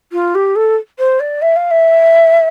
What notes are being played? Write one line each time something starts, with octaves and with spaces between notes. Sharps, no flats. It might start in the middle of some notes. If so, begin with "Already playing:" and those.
F4
G4
A4
C5
D5
E5
F5
E5